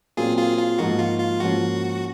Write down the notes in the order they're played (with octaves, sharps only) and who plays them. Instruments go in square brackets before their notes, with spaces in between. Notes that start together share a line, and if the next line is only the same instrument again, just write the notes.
[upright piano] A#2 F#3 C4 [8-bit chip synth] F4 G#4
[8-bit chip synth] F4 G#4
F4
[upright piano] G#2 F3 A#3 D#4 [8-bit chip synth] F#4
[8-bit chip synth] F4
F4
[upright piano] G#2 F3 A#3 C#4 [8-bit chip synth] F#4